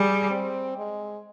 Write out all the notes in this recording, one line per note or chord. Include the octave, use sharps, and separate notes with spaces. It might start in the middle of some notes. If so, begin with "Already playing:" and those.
Already playing: G3 G#4
C4
G#3